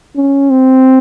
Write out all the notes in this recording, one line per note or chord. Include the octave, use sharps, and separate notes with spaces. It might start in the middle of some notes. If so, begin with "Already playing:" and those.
C#4
C4